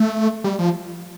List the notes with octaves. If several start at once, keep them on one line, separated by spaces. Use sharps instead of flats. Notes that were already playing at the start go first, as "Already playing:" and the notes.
Already playing: A3
G3
F3